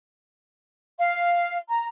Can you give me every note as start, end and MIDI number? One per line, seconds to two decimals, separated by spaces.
0.98 1.57 77
1.68 1.85 82